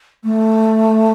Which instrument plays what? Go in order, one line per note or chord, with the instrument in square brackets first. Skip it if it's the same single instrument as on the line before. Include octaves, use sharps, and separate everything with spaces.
[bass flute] A3